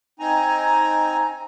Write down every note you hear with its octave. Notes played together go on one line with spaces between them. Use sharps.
C4 D#4 G#5 A#5